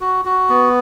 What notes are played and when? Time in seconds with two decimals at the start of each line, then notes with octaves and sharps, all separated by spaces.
0.01 F#4
0.25 F#4
0.49 B3